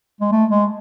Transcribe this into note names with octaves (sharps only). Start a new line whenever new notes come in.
G#3
A3
G#3